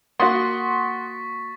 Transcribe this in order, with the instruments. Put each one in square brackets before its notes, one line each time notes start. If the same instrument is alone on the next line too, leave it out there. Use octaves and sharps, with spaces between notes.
[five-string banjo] A#3 F#4 [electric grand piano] F#5 C6 D#6 [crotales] C#6 A6 B6